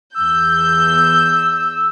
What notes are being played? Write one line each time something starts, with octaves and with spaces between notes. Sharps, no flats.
E2 E6 G6